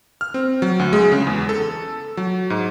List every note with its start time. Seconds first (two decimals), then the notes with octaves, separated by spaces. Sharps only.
0.21 F6
0.34 C4
0.62 F#3
0.79 D2
0.93 G#3
1.12 C#3
1.27 E2
1.49 A4
2.17 F#3
2.50 G#2